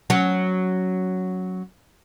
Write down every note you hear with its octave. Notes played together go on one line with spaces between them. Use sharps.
F#3 C#4